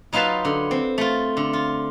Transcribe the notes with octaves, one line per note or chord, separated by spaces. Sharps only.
F#3 D#4 F4 B4 F5 A5
D3
C4
A3 F4
D3
F4